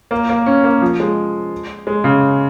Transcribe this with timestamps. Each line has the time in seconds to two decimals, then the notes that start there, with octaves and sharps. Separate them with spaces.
0.11 A#3
0.29 A#3
0.46 C#4
0.64 A#3
0.81 F3
1.00 G#3
1.87 G#3
2.04 C#3